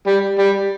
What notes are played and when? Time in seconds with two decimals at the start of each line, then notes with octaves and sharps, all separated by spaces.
0.07 G3
0.39 G3